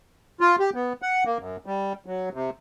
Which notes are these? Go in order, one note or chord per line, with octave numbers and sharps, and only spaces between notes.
F4
G4
B3
F#5
A#3
F#2
G3
F#3
C3